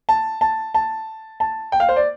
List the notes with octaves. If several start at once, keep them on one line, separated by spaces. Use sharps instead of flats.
A5
A5
A5
A5
G5
F5
C5
D5